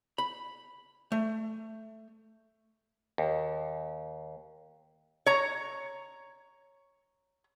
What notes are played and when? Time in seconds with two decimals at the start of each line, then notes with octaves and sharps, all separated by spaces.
0.18 B5
1.12 A3
3.18 D#2
5.26 C#5 A#5